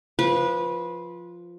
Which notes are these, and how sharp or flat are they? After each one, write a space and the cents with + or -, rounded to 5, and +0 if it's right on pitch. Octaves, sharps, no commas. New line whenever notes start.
F3 +0 B4 -20 D6 +0